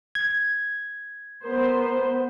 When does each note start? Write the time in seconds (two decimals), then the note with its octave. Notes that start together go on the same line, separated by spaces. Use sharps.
0.15 G#6
1.44 B3 A#4 C5